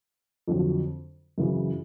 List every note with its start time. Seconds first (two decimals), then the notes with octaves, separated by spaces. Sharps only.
0.48 F2 D3 F#3
1.38 F#2 C#3 E3